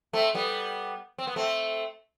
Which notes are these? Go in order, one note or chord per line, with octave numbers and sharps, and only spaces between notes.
A3 C4
G3 B3
C4
B3
A3 C4